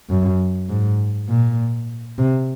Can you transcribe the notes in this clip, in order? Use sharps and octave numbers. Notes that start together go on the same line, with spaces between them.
F#2
G#2
A#2
C3